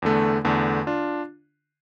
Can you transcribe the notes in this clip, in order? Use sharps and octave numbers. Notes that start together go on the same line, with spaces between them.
E2 D3 A3
E2 D3 A3
D4 F4